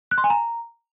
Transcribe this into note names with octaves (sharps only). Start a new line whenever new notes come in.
F#6
C6
G#5
A#5